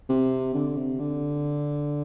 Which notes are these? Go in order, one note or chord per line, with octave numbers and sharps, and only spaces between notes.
C3
D3
C3
D3